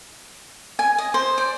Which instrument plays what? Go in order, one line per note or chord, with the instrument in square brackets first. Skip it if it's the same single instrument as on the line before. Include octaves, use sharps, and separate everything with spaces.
[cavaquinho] G#5
D#5
C5
D5